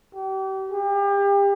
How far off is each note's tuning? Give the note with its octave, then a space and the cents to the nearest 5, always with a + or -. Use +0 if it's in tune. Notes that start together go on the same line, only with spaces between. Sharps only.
G4 -35
G4 +35